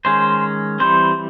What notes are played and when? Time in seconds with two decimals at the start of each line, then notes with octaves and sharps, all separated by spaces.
0.05 D#3 G#3 C#4 C5
0.80 E3 G3 C4 C5